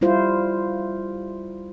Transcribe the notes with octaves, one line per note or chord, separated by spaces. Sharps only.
G3 E4 F4 C5